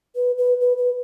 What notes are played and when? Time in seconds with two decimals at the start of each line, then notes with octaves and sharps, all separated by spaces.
0.16 B4
0.38 B4
0.61 B4
0.78 B4